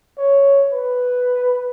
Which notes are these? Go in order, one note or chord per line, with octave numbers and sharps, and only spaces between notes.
C#5
B4